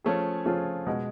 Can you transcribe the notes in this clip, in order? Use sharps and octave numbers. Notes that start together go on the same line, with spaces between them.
F3 A3 C#4 F4 G#4
F3 A3 C#4 F4 G#4
B2 G#3